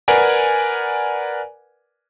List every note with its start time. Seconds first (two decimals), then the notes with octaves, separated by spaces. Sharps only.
0.08 A#4 B4 D5 F#5 G#5